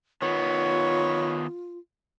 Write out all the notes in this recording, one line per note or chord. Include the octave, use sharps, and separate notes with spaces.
D#3 B3 F4 C#5